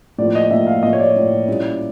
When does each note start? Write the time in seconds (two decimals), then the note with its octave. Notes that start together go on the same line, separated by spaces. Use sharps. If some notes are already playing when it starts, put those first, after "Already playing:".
0.18 A2 F3 A#3 D5
0.35 D#5
0.51 A2 F3 A#3 E5
0.67 F5
0.83 A2 F3 A#3 D#5
0.93 C#5
1.00 D5
1.16 A2 F3 A#3
1.48 A#2 G3 A#3 C#4 E4